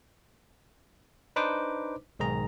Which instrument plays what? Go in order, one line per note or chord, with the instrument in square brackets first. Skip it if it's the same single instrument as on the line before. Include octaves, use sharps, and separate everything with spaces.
[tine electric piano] D4 D#4 B4 C5 D6
B1 G#2 D#3 G#4 A#5